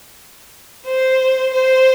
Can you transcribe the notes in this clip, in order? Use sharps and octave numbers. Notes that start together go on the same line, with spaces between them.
C5
C5